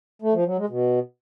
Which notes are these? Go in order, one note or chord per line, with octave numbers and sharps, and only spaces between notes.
A3
F3
F#3
G#3
B2